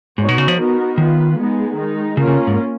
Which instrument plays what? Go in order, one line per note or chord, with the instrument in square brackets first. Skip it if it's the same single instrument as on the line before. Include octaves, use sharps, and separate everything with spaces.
[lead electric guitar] G#2 [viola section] B3 D#4 F#4 C#5
[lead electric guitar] B2
C#3
F3
[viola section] B3 D#4 F#4 A#4
[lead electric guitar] D#3 [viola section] B3 F4 B4
[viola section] G#3 B3 D#4 G#4
D#3 G#3 D#4
[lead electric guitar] C#3 [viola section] A#3 C#4 F4 A#4
[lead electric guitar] C#3
G#2